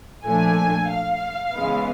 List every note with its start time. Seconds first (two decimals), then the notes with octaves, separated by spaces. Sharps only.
0.25 A#2 F3 A3 D4 G#5
0.90 F5
1.54 C#3 E3 G#3 B3